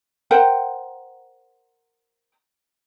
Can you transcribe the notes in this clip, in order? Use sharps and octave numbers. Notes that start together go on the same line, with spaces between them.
A#4 C5 F#5 G5